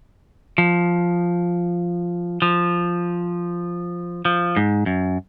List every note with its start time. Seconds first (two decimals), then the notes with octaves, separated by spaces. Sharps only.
0.58 F3
2.42 F3
4.25 F3
4.57 G#2
4.86 F#2